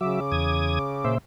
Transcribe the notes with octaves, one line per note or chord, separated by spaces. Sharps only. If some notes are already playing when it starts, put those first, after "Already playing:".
C#3 F#3 E5 D6
E2 D#6 G#6
A#2 C5 E5